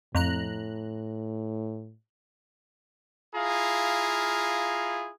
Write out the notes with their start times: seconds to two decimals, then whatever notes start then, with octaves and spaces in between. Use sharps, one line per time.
0.15 F2 A2 A#5 F#6
3.35 E4 F4 G#4 F5 A#5